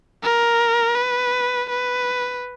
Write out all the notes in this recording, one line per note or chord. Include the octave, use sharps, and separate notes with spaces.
A#4
B4
B4